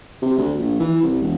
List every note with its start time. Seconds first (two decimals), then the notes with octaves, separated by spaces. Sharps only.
0.22 C3
0.37 D2
0.59 A#1
0.80 E3
1.02 C2
1.22 E1